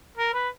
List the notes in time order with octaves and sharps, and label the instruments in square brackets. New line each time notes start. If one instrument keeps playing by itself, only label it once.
[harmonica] A#4
B4